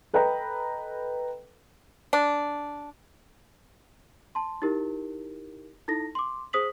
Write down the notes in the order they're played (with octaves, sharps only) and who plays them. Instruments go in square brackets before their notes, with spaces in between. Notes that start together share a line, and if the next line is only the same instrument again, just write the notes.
[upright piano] A4 B4 D#5 G5 A#5 B5
[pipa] D4
[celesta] A5 C6
D#4 E4 G4 A#4
D#4 E4 A4 A#6
C6 D6
G#4 C5 D#6 B6 F#7